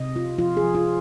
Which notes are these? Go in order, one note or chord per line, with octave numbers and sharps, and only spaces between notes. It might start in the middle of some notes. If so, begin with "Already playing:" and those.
Already playing: C3 D#5
F4
F3 F4
G#4
F3
F4